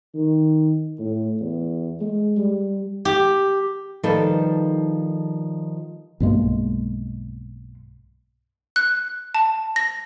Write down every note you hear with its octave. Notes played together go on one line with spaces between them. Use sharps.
D#3
A2
E2
G#3
G3
G4
D#3 F3 G3 D#4 A4 B4
B1 G2 G#3 A#3
F#6
A5
A#6